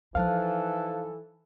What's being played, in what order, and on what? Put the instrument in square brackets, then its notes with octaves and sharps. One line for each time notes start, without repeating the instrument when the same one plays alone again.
[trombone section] E3 A4 [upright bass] F3 D#4 [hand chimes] C5 A5 F#6 [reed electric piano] F5